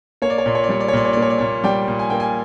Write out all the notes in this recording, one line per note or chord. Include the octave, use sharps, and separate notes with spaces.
A#3 C#5
D5
C#5
A#2 D5
C#5
D5
G3 C#5
D5
C#5
A#2 D5
C#5
D5
A#3
C#5
D5
A#2 C#5
G3 G5
A#2
G#5
A#3 G5
G#5